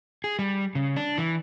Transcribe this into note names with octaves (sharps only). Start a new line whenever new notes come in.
G#4
G3
C#3
D4
E3